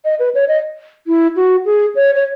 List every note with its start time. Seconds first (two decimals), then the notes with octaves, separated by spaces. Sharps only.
0.05 D#5
0.19 B4
0.35 C#5
0.48 D#5
1.07 E4
1.36 F#4
1.66 G#4
1.95 C#5
2.15 C#5